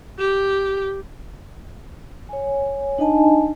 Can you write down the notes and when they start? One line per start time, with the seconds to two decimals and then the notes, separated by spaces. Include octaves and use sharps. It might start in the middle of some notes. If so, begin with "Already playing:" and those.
0.18 G4
2.29 C#5 G#5
2.98 D4 D#4 D#5 G#5 A5